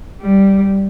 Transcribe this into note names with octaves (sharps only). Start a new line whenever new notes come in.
G3